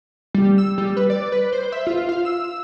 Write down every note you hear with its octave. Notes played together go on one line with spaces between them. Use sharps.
G3
E6
G3
B4
D5
B4
C5
E5
F4
F5
E6